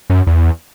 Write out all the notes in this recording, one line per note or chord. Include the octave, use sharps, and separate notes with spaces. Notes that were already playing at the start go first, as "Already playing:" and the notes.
F#2
E2